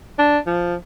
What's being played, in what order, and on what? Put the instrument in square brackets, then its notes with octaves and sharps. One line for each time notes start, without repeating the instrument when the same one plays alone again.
[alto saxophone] D4
F3